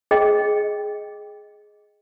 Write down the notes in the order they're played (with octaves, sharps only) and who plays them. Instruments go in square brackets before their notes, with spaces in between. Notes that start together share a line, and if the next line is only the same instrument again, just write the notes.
[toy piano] G#4 D#5 G5